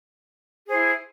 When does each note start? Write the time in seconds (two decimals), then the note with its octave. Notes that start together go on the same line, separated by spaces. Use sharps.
0.67 G#4
0.69 C5
0.72 E4